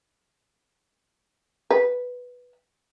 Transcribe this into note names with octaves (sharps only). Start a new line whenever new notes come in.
B4